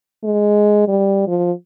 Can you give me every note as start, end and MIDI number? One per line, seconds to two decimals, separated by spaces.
0.24 0.84 56
0.88 1.24 55
1.27 1.52 53